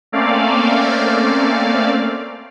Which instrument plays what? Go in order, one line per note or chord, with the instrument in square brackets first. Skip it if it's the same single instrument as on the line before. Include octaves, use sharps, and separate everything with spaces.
[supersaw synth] A3 A#3 C4 C#4 D5 F5